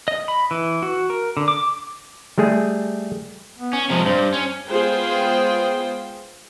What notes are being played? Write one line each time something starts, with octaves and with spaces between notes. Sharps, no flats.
D#5
B5
E3
F#4
A#4
D3
D6
G3 A3 G#4
B3
C#4
C3 F3 G#3
G2 C5
C#4
G#3 B3 F4 G#4 C5 G5